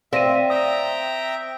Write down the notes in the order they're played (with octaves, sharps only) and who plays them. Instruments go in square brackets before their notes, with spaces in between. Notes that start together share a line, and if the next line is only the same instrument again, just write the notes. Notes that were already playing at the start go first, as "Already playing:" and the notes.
[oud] C4 [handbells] D5 A#6 [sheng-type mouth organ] E5 [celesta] F5 D#7
[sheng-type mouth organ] E5 G5 A#5 [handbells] D#6